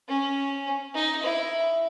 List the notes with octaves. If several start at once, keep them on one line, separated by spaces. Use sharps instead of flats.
C#4
D#4
E4